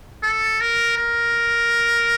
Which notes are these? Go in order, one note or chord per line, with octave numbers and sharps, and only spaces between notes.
A4
A#4
A#4